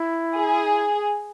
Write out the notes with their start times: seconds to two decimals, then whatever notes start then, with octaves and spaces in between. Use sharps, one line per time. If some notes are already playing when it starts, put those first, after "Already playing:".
Already playing: E4
0.36 G#4